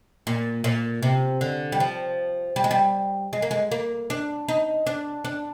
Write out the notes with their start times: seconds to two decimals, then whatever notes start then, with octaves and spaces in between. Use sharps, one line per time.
0.27 A#2
0.64 A#2
1.03 C3
1.41 D3
1.72 G3
1.80 F3
2.56 G3
2.64 G#3
2.71 G3
3.33 G#3
3.42 A#3
3.51 G#3
3.72 A#3
4.10 D4
4.48 D#4
4.87 D4
5.25 D4